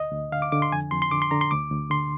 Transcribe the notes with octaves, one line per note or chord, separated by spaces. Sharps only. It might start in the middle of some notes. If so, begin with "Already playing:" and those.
Already playing: D2 D#5
D2
D3 F5
D6
D3 D6
C6
F2 G#5
F2 C6
C6
D3 D6
C6
D3 A#5
C6
D2 D6
D2
D3 C6